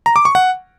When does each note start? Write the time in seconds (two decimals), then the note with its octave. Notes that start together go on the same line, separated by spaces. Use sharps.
0.06 A#5
0.16 D6
0.25 C#6
0.35 F#5